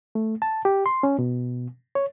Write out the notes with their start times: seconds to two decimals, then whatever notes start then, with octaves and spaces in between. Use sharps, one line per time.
0.15 A3
0.42 A5
0.65 G4
0.86 C6
1.03 C#4
1.19 B2
1.95 C#5